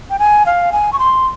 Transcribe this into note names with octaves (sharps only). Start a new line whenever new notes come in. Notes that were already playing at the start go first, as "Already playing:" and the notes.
G5
G#5
F5
G#5
C#6
C6